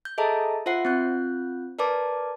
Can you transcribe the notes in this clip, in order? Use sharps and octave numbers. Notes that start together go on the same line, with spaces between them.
G6
G#4 A4 D#5 E5 A5 A#5
F4 C5 E5 F#5 C7
C4 F4 F#6 G6
A#4 B4 D5 A5 D6